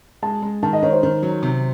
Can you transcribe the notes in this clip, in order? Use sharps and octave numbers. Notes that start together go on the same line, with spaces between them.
G#3 A5
G#3
D#3 A5
D#5
D#3 C#5
C5
D#3
F#3
C3